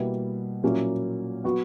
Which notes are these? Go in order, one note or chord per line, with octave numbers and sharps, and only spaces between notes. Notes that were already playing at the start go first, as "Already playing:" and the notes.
Already playing: B2 G3 A#3 E4 B4
A#2 F#3 A#3 C#4 E4
F#3 B3 F#4